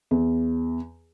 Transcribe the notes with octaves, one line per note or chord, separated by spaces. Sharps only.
E2